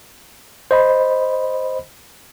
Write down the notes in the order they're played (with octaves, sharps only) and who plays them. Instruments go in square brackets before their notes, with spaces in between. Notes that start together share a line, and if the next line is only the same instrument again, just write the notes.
[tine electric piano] C5 D#5 B5